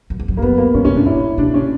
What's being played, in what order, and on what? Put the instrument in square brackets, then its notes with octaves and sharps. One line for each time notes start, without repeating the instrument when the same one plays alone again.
[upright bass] F#2
E2
F#2
[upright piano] A#3
[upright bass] F#2 [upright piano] B3
[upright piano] A#3
[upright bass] G2 [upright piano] C#4
[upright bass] C#3 [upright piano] C#4
[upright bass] B2 [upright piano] D4
[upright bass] A#2 [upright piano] E4
[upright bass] B2 [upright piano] D4
[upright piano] C#4